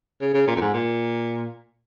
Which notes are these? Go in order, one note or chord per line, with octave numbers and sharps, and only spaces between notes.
C#3
C#3
A#2
F2
G#2
A#2